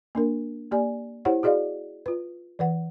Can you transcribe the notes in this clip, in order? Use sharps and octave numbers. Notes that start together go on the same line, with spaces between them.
A#3 D4 A#4
A#3 G4 D5 G#5
E4 G4 C5 C#5 F#5
F#4 G#4 D5 D#5 F5
F4 B4
E3 B4 F#5